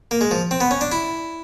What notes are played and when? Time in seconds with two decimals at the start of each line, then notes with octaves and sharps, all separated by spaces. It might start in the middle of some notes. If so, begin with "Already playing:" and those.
0.11 A#3
0.21 G#3
0.31 F3
0.51 C4
0.61 B3
0.71 C#4
0.81 D4
0.92 E4